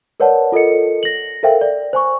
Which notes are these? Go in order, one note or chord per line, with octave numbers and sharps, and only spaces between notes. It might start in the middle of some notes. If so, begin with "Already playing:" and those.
A#4 B4 C#5 D5 F#5 A5
F4 A4 A#4 D#5 C#7
A#6 F#7
A4 A#4 C5 E5 F5 G5
D5
C5 G#5 C#6